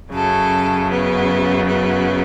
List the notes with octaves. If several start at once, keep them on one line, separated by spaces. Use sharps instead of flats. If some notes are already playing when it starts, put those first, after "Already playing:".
F#2 C#3 F#3 A4
B3
B3